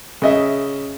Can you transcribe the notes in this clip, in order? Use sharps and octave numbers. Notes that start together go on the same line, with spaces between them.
C#3 D#5 E5